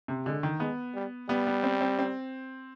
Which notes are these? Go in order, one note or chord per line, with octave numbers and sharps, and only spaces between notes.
C3
D3 G#3
D#3
G#3 B3
G3
G3 B3
B3
C4
C4
C4